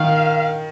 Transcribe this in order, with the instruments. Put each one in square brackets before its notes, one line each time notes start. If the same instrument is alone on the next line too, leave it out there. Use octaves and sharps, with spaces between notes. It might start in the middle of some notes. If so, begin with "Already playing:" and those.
Already playing: [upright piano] D#3 [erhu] F5